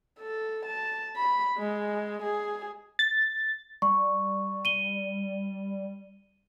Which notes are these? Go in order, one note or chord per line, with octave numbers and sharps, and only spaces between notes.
A4
A5
B5
G#3
G#4
A6
G3 C#6
D#7 G7